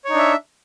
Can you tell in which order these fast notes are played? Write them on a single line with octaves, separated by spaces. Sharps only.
C#5 D#4 D4 E5